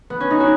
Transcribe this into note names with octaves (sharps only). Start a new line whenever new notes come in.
B3
C#4
D#4
F#4